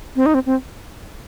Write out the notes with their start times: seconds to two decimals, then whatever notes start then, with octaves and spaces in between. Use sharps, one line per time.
0.16 C4
0.26 D#4
0.34 C4
0.46 C4